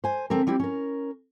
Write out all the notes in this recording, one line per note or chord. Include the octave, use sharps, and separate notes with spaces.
C5 G#5
D3 C4 A4 A#4
G3 C4 E4 G4
C#4 A#4